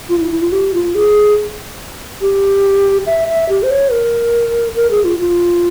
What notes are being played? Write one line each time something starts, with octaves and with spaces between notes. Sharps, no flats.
F4
E4
E4
F4
G4
F4
G#4
G4
E5
E5
G4
C5
C#5
A#4
A#4
G#4
F4
F4